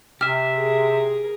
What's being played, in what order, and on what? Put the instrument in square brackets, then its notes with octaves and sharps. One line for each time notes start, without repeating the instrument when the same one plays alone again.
[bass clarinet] C3 [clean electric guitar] G4 E5 [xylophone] F6
[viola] G#4 A#4